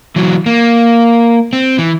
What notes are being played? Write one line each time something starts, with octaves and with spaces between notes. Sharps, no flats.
E3 F#3
A#3
C4
E3